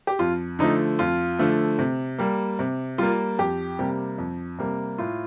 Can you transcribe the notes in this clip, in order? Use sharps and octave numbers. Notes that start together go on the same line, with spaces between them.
G4
F2 F4
D3 F3 A3 D#4
F2 F4
D3 F3 A3
C3
G3 A#3
C3
G3 A#3 F4
F2 G4
C3 G3 A#3
F2
C3 G3 A#3
A2 F4